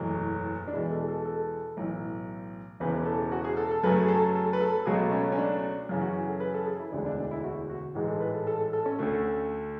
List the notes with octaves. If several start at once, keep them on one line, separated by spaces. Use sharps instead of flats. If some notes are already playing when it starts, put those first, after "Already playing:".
Already playing: F#1 E2 B2 F#3 A3
D4
E2 B2 G#3 E4
A4
A4
A4
B1 A2 E3
E1 E2 C#3 E3 B4
A4
F#4
G#4
A4
A4
F#2 C#3 F#3 A3 B4
G#4
A4
A4
B4
A4
C#2 B2 F#3 A3 G#4
C#4
C#4
D4
F#2 C#3 E3
F#4
A4
B4
A4
G#4
E4
E1 D2 D3 G#3 D4
D4
D4
E4
F#4
F#4
A1 G#2 E3 G#3 G#4
A4
B4
A4
A4
A4
A4
C#4
D2 D3 A3